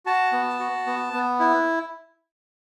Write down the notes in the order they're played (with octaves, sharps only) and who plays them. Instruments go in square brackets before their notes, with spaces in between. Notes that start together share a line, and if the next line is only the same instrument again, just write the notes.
[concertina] F#4 A5
B3
F#4
B3
B3
E4